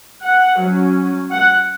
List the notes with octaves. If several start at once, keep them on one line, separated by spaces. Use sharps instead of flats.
F#5
F#3 C#4
F#5